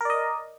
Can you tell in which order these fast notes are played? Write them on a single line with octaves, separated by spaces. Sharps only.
A#4 D5 D#5